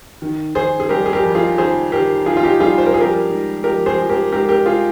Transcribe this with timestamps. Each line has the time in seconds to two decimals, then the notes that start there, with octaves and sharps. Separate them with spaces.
0.22 D#3
0.55 D#3 G#4 C5
0.80 G#4
0.89 G3 G4 A#4
1.06 G#4
1.13 G4 A#4
1.23 F2
1.35 F4 G#4
1.58 D#3 G#4 C5
1.92 D#3 G4 A#4
2.26 D#3 F4 G#4
2.37 F4
2.43 D#4 G4
2.60 G3 F4 G#4
2.78 C5
2.86 A#4
2.94 F3 G#4
3.01 G4 A#4
3.29 G#2
3.64 F3 G4 A#4
3.86 G#4 C5
3.98 F3
4.09 G4 A#4
4.32 G#2 G4 A#4
4.49 G4 A#4
4.66 F4 G#4